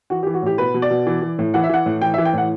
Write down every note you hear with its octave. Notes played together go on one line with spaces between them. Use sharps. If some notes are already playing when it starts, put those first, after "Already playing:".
E3 F#4
G4
E3
F#4
A2 G4
B2 B4
B2
D5
B2
E3
E3
A2
E3 F#5
E5
E3 F#5
A2
E3 G5
E5
E3
G5
A2 F#5